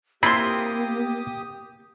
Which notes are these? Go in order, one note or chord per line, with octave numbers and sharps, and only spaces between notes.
A#3 C4 E4 F4 G4 B5 C6 D#6